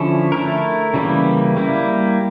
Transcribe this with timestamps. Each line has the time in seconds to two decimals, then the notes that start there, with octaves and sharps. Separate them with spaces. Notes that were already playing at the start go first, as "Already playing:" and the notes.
Already playing: D3 F3 C#4 E4 A4
0.32 A3 E4 A#4
0.94 C#3 E3 G3 A#3 E4
1.57 G3 A#3 E4